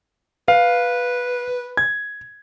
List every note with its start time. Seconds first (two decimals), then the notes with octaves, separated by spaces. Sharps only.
0.48 B4 F5
1.77 G#6